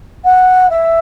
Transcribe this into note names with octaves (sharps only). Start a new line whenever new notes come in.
F#5
E5